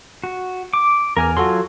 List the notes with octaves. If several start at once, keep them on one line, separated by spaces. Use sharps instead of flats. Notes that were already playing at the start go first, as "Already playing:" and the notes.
F#4
D6
E2 A#4 G#5 F6
F#3 F4 F#4 A4 C6